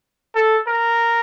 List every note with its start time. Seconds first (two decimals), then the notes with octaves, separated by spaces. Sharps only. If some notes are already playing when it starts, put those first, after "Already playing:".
0.35 A4
0.67 A#4